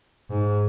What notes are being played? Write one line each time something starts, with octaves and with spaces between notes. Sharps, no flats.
G#2